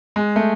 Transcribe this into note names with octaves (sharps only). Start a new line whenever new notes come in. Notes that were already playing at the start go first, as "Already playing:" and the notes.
G#3
A3